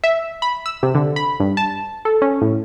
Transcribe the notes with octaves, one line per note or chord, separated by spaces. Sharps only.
E5
B5
E6
C3
D3
B5
G2
A5
A4
C#4
A2